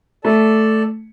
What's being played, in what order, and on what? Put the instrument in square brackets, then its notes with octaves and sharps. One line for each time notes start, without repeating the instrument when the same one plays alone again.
[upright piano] A3 [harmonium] A4 D5 A5